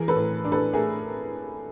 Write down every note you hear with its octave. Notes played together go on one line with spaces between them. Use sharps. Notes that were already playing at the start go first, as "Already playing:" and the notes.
Already playing: E3 G#4 A#4
A4 B4
A2
D4
A4 B4
A3 G#4 A#4